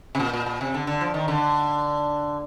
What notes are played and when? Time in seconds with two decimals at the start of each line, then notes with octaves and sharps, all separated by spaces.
0.15 C3
0.20 A#2
0.33 A#2
0.46 A#2
0.61 C3
0.74 D3
0.87 D3
1.01 F3
1.14 D#3
1.28 D3